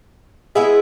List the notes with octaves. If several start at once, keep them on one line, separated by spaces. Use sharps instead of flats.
G#3 B3 E4 G#4